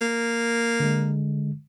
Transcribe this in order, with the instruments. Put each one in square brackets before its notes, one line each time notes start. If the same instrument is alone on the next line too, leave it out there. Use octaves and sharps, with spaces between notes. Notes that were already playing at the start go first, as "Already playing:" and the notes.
[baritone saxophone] A#3
[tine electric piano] D3 G#3